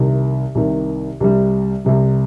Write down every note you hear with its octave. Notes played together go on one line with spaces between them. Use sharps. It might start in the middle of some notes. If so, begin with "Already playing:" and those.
Already playing: C2 C3 D#3
C2 C3 D#3
C2 C3 G3
C2 C3 G3